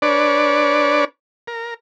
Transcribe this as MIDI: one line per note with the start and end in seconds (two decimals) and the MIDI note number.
0.02 1.05 62
0.02 1.05 71
0.02 1.05 73
0.02 1.05 74
1.47 1.74 70